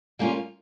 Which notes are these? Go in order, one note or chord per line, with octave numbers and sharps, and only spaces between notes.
G3 A#3 C#4 F4